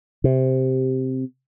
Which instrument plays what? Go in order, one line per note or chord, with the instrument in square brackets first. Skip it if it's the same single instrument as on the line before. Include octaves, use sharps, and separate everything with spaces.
[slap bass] C3